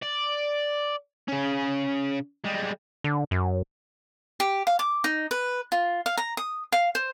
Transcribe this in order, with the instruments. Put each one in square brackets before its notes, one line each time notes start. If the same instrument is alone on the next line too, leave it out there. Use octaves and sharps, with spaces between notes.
[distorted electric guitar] D5
C#3 C#4
G3 G#3
[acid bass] D3
F#2
[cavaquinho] G4
F5
D6
D#4
B4
F4
F5
A#5
D#6
F5
C5